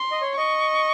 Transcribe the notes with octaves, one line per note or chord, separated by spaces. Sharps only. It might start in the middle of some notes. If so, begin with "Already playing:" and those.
Already playing: C6
D#5
C#5
D#5 C#6